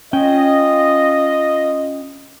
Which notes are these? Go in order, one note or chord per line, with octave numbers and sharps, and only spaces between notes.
C#4 F4 D#5 G5